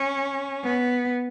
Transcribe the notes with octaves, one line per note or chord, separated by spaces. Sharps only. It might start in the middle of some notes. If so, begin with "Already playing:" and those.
Already playing: C#4
B3